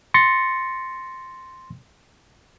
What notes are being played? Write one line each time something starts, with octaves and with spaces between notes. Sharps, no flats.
C6 A6 A#6 C#7